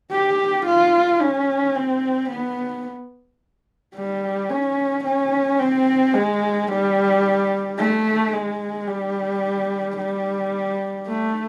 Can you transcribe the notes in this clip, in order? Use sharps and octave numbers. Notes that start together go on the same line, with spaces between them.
G4
F4
C#4
C4
B3
G3
C#4
C#4
C4
G#3
G3
A3
G#3
G3
G3
A3